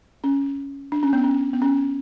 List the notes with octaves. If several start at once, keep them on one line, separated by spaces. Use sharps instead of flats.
C#4
D4
C#4
B3
C#4
B3
C#4